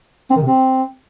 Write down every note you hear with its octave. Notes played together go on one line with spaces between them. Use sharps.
C4
D#3
C3
C4